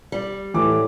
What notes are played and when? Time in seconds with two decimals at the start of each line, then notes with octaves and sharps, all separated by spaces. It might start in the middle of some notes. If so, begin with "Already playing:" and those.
0.12 G3
0.54 A2 E3 D6